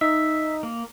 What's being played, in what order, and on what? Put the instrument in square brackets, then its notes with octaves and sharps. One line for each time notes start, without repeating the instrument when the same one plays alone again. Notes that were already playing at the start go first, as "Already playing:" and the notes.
[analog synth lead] D#4 [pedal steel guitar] E5
[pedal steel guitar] A#3